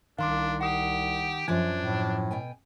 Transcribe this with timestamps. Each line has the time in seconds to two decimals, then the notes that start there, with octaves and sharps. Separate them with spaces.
0.18 C2 D#3 D4 F5 C6 D6
0.61 G4 F#5 D#6
1.48 F#2 F3 D4 G#5 G#6
1.81 A2
2.31 B2 G5 G#5